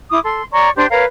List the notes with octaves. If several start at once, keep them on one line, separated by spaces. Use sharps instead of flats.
E4 D6 D#6
A4 C6
C#5 D5 A#5 C#6
D4 G4 C5 C6
A#4 B4 C#5 F5